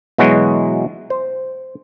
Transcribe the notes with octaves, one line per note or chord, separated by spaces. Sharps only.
B2 E3 F#3 G#3 F#4
C5